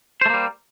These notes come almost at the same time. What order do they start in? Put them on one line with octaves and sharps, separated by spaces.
C5 A3 A#3 G3